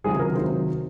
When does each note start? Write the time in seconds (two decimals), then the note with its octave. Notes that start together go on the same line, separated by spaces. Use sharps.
0.04 C#2 C3 D#3 F#3 G#4
0.19 A#4
0.36 C3 D#3 F#3 C5